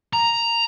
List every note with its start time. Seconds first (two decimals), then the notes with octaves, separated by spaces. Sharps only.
0.13 A#5